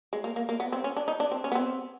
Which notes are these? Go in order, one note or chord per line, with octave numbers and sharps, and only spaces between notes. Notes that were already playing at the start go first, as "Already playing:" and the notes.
G#3
A#3
A#3
A#3
B3
C4
C#4
D4
D#4
D4
C4
C#4
B3
C4